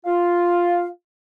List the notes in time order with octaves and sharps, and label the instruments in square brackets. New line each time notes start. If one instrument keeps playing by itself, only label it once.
[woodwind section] F4 F5